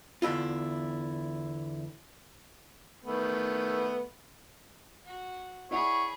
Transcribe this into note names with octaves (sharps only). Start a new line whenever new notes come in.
E2 D3 E4 F4
D#3 A3 B3
F#4
E4 G#4 C#5 D5 F#5 B5